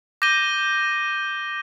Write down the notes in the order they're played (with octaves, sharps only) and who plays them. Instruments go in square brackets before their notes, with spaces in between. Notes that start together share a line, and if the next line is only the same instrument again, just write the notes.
[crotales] D6 G6 A#6 D#7 G7